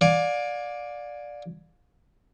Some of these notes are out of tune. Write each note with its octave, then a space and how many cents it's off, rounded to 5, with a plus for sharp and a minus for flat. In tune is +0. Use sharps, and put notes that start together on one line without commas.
D5 +0 F5 +35 G#5 +0